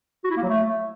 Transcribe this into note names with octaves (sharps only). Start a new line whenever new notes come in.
F#4
E4
A#3
F#3
A3